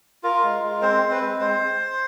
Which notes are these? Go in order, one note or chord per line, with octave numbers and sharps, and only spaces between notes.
F4 A#4
G#3
G#3
C4 C5
C4
B4
G#3
G#3 C5